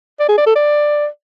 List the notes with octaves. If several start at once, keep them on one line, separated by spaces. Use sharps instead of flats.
D5
G#4
D5
A4
D5